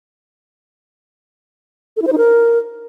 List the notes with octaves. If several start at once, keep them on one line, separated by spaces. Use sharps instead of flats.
A4
E4
C5
D#4
A#4